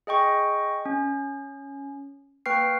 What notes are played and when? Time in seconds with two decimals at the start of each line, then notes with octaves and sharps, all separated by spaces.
0.07 G#4 D#5 G5 C#6
0.86 C#4
2.46 A#3 B4 G5 C#6 F6 C7